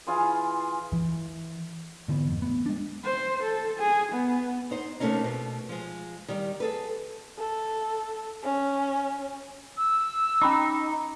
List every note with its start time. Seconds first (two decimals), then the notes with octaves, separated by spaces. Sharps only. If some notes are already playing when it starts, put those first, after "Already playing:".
0.07 E3 F4 G#4 F5
0.92 E3
2.08 G#2 D3 E3 B3
2.29 G#1 F2
2.42 A1 B3
2.66 G#3 D4
3.04 C5
3.43 A4
3.79 G#4
4.12 B3
4.71 D#4 C5
5.00 C3 A3 A#3 C#4 D#4
5.24 B2
5.69 F3 G#3
6.28 D#3 G3
6.60 G#4 A4 B4
7.38 A4
8.43 C#4
9.76 E6
10.42 C#4 D#4 B5 D6